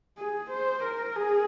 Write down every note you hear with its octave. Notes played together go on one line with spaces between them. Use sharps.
G#4
C5
A#4
G#4